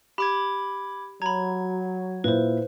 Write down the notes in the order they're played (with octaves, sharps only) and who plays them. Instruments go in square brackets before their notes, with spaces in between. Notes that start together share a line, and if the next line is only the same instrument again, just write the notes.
[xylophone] G4 [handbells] B5 D6 G#6
[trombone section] F#3 [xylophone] A#5 B5 [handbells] G#6
[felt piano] A#2 E4 [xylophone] B4 C5